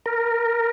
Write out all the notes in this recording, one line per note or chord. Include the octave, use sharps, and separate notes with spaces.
A#4